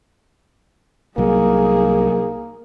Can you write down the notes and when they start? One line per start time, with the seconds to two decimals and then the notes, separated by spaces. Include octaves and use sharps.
1.18 C2 F#3 A#3 D#4 G#4